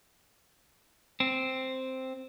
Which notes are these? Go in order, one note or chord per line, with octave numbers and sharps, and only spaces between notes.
C4